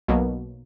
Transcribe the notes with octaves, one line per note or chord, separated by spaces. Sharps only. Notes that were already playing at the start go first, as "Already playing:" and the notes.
B1 B2 F#3 A#3